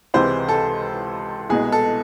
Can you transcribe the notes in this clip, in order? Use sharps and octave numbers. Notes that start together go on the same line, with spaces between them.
C#2 C3 E3 G#3 C5
A4
C2 B2 G#3 G#4
A4